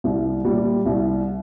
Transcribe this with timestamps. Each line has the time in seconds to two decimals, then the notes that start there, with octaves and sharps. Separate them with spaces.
0.04 C2
0.45 A#2 G3
0.85 C2